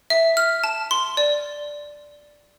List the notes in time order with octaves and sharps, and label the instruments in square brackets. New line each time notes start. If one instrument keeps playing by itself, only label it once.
[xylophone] E5
F6
A5
C6
D5